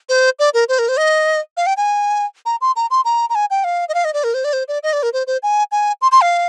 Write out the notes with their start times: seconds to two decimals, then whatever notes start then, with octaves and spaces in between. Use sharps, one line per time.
0.09 C5
0.39 D5
0.54 A#4
0.69 C5
0.79 A#4
0.88 C5
0.98 D#5
1.57 F5
1.66 G5
1.77 G#5
2.46 A#5
2.61 C6
2.76 A#5
2.91 C6
3.05 A#5
3.30 A#5
3.35 G#5
3.50 G5
3.64 F5
3.89 D#5
3.94 F5
4.04 D#5
4.14 D5
4.24 A#4
4.34 C5
4.44 D5
4.53 C5
4.68 D5
4.83 D#5
4.93 D5
5.03 A#4
5.13 C5
5.27 C5
5.43 G#5
5.72 G#5
6.02 C6
6.12 C6
6.21 F5